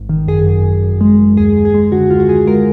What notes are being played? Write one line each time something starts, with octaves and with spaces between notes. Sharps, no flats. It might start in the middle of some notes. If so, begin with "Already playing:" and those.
Already playing: G#1
D#3
F#2 G#4
F#2
F#2
F#2
G#3
F#2
D#2 G#4
D#2
G#4
G#3
D3 F#4
D#2 F4
F#4
D#2 G#4
G#3 A#4